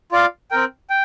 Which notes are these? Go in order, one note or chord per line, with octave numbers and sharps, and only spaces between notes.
F4 D5 F5
C4 A#4 G5
G5